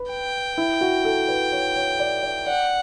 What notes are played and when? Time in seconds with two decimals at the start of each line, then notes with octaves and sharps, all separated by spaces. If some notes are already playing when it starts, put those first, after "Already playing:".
Already playing: B4
0.11 G5
0.58 E4
0.81 F#4
1.05 A4
1.28 B4
1.52 C#5
1.76 C#5
2.00 D5
2.23 D5
2.47 D5 F#5